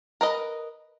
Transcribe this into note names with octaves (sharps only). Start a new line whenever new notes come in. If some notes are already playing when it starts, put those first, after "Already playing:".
A#4 B4 D#5